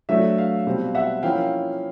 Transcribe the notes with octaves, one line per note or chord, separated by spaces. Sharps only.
F#3 A3 D4 E5
F5
B2 G3 C4
E5 F#5
F3 A#3 C#4 E4 F5 G5